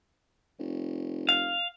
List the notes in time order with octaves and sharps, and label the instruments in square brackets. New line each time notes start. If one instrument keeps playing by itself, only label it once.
[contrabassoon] F1
[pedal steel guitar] F5